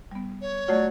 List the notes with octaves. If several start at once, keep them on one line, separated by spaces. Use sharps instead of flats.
G3 B3
C#5
F#3 A3 F4 D5